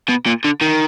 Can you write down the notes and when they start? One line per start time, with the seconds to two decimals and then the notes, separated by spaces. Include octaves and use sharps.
0.09 B2
0.26 A#2
0.45 D3
0.62 D#3